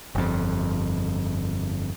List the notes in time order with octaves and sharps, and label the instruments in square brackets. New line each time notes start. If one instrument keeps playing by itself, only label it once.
[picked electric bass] G1 F2